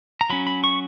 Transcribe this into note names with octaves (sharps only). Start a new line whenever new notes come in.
A#5
F#3 C#4 B5
B5
C#6